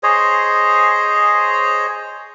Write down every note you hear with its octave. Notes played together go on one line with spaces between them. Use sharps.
G#4 C5 C#5 D#5